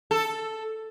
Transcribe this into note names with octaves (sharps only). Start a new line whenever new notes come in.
A4